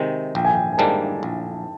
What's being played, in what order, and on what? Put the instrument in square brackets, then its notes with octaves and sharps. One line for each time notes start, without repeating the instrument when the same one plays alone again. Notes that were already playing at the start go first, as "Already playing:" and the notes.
Already playing: [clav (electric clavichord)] C3 D#3 G#3
[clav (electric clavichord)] A#1 [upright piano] G5
[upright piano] G#5
G5
G#5
[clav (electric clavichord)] G#2 D#3 G3 A#3 [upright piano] A5
[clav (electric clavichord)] A#1